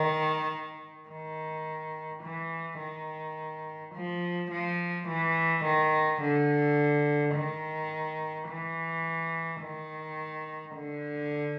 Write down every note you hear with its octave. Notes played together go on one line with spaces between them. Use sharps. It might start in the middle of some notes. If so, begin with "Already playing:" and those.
Already playing: D#3
D#3
E3
D#3
F3
F3
E3
D#3
D3
D#3
E3
D#3
D3